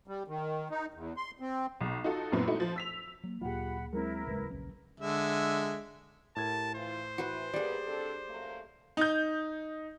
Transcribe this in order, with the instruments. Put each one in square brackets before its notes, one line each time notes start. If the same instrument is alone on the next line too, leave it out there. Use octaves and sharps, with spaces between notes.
[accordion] G3
D#3
D#4
E2
C6
C4
[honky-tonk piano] B1
D#4 F4 F#4 A4
F#2 A#2 F#3 B3 C4 E4
A3 D#4 E4 F#4
F3 C5
E6 B6 F7
[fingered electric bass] F#3 [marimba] A#3
[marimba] D2 G#4 [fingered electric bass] A#2 F#3 [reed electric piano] F4 G4 [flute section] F#5 B5
[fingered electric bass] F#3 [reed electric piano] G#3 C4 [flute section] E4 A#4
[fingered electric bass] G#1 G#3 [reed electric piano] E2 C#3 [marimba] F#3 B4
[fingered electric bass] A#1 C#4
[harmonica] D3 G#3 E5
[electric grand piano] A2 G#6 [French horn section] G4 A#4 [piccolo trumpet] A5
[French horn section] E3 F4 [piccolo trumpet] C5
[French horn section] E3 [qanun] F#4 B4
[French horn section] B2 A#3 B4 [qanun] G3 G#4 [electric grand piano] D5
[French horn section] C4 D4 A4
F#2 A3 A#3
[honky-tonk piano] D#4 G6